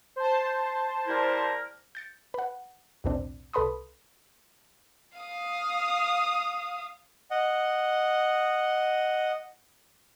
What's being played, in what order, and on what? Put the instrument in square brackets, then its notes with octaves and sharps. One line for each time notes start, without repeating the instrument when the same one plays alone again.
[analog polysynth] C5 A5
[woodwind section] G3 E4 A#4
[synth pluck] G6 A6 C#7
B4 F#5
B1 E2 A2 E3 C4 D4
C2 A4 B4 B5 C6 D#6
[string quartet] F5 D#6
[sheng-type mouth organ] D#5 F#5